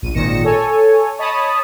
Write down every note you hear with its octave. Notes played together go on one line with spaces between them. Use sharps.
A#1 D#7
G#1 A#2 D#3 A#6 C#7 E7
A4 C#5 G#5
C#5 D#5 A5 B5 D#6